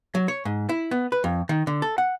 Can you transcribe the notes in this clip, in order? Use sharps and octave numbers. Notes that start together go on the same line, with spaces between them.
F#3
C#5
G#2
E4
B3
B4
F2
D#3
D3
A4
F#5